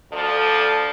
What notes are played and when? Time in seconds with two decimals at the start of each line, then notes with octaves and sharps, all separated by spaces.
0.11 D2 F3 A4 D5